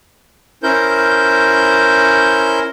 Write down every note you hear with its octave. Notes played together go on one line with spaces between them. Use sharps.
C#4 E4 A#4 C5 G6